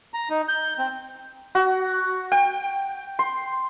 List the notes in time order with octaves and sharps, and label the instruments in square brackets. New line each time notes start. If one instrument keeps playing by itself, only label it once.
[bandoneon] A#5
D#4
G6
C4
[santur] F#4
G5
C6